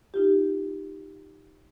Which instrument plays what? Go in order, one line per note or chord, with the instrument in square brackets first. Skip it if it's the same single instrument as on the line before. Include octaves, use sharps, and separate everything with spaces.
[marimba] D#4 F4 G4